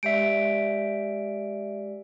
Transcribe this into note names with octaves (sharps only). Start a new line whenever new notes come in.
G#3 G4 D5 E5 D7